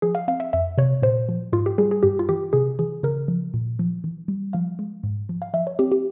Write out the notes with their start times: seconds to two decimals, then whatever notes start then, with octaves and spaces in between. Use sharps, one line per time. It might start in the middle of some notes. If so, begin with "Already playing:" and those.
0.02 F3 G#4
0.15 F5
0.28 C4 F5
0.40 E5
0.53 F2 E5
0.78 C3 C#5
1.02 A#2 C5
1.29 F3
1.53 G#2 F4
1.66 G4
1.78 G3 G#4
1.91 G#4
2.03 G2 G4
2.19 F4
2.29 E3 G4
2.53 C3 G#4
2.79 E3 G#4
3.03 C#3 A#4
3.28 F3
3.54 A#2
3.79 F3
4.04 E3
4.28 G3
4.53 F3 F5
4.79 G#3
5.03 G#2
5.29 F3
5.42 F5
5.54 F3 E5
5.67 C#5
5.79 C4 G4
5.92 G4